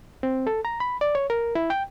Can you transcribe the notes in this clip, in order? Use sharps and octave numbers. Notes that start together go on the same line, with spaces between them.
C4
A4
A#5
B5
D5
C#5
A#4
E4
G5